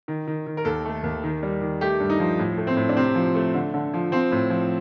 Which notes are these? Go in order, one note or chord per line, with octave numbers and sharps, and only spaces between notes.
D#3
D#3
D#3
A#4
D#2 A4
A3
D#2
D#3
G3
D#3
A3 G4
G2
D#4
F3
A2
A3
C4
A2
D4
C3 C4
F3
A3
D3
D3
F3
F3 C4
A2
F3